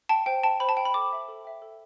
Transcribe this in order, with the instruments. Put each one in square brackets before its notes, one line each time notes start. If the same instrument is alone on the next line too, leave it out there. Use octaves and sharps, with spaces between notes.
[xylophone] G5 A5
C5 G5
G5 A5
C5 B5
A5
G5
B5
A4 D6
E5 G5
A4
E5 G5
A4